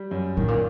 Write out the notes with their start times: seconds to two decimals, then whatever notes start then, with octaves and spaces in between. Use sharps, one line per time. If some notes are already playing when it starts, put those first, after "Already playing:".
Already playing: G3
0.11 F#2
0.37 A2 D#3
0.48 A#2